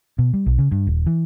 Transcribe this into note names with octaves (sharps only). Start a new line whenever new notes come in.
B2
G3
B1
C#3
G2
D#1
E3